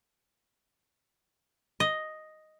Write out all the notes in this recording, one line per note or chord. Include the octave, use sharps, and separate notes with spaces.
D#5